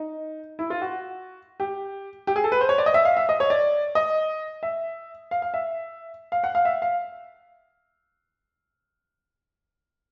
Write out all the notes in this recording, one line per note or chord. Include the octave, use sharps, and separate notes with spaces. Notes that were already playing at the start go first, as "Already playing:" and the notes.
Already playing: D#4
E4
F4
F#4
G4
G4
G#4
A4
B4
C5
C#5
D5
D#5
E5
F5
E5
D#5
C#5
D5
D#5
E5
F5
F5
E5
F5
F#5
F5
E5
F5